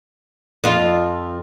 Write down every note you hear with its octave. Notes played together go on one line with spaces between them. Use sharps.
F2 F4